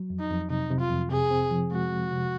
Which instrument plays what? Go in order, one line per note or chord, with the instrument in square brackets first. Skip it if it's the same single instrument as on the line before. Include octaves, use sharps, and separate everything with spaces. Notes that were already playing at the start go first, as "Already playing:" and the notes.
Already playing: [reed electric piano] F#3
F2
[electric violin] D#4
[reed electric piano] F2
[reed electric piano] C3 [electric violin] D#4
[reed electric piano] C3
[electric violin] F4
[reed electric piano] F2
[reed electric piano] C3 [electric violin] G#4
[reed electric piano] C4
F3
[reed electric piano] G#3 [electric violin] F#4
[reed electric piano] G#3
C3